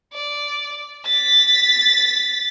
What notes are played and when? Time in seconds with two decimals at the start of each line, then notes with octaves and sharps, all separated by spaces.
0.14 D5
1.06 A6 B6